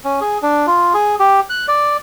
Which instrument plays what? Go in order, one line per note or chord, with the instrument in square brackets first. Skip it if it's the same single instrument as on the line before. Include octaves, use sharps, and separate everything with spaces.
[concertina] C#4
G#4
D4
F4
G#4
G4
F#6
D5